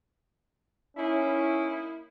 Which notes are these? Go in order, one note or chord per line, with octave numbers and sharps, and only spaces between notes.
A#3 C#4 D#4 E4